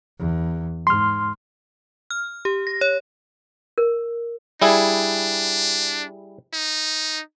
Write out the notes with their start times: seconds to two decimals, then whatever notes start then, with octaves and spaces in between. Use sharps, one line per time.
0.19 E2
0.87 G#2 C6 F6
2.10 F6
2.45 G4
2.67 A#6
2.81 C#5
3.78 A#4
4.62 G3 D4 E4 G#4
6.53 D#4